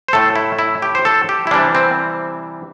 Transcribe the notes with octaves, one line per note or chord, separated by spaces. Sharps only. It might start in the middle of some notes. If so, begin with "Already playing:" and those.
C5
A2 A3 A4
E4
E4
G4
C5
A4
G4
E4
C3 E3 G3 D4
C4